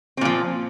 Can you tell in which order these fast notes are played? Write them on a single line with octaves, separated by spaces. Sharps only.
C4 A#2 F3